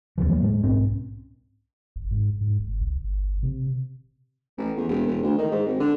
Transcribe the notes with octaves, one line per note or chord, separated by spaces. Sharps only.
D#2 C#3 E3 F3
F#3 G3 A#3
A2 G#3
B1 G#2 C4 C#4
G1
G#2
G#2
G1
C2
G1
C3
A1
E2
E1
E1
D2
D#3
G#2
G#1
D3